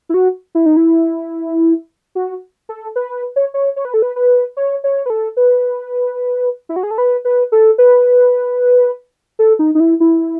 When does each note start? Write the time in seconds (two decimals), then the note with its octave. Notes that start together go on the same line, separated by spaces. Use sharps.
0.09 E4
0.14 F#4
0.55 E4
0.66 D#4
0.77 E4
2.15 F#4
2.69 A4
2.96 B4
3.36 C#5
3.54 C#5
3.76 C#5
3.85 B4
3.94 A4
4.02 B4
4.16 B4
4.57 C#5
4.84 C#5
5.06 B4
5.10 A4
5.37 B4
6.69 E4
6.76 F#4
6.83 G#4
6.91 A4
6.98 B4
7.25 B4
7.52 A4
7.78 B4
9.39 A4
9.59 D#4
9.75 D#4
9.80 E4
10.00 E4